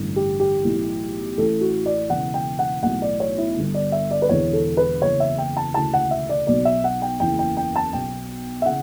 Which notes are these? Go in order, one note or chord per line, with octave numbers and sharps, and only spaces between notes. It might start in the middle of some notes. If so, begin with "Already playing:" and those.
Already playing: A1 G2 D3
G4
G4
B1 A2 E3
A1 A2 E3 A4
F#4
D5
E1 E2 C#3 E3 F#5
G5
F#5
B1 A2 E3 F#5
D5
C#5
E4
G1 G2 D3
D5
E5
D5
B4
E1 E2 D3 C#5
A4
B4
F#1 E2 C#3 C#5
E5
G5
A5
E1 D2 C#3 E3 A5
F#5
E5
D5
B1 B2 D5
E5
F#5
G5
F#1 E2 C#3 E3 G5
G5
G5
A5
B1 B2 G5
E5
C#3 E3 F#5